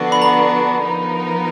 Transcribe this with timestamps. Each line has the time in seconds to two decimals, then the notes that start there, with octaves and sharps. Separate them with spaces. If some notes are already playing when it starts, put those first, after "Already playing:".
Already playing: D3 F3 B3 D4 F#4
0.12 B5
0.22 A#5
0.83 F3 B3 D#4 A#4